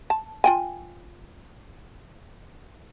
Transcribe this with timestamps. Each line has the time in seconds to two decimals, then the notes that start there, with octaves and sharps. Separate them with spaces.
0.10 A5
0.44 F4 G5 G#5